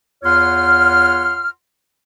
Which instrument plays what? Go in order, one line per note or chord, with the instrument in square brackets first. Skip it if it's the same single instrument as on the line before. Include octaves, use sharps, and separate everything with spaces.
[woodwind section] E2 F4 C#5 F#5 C6 F6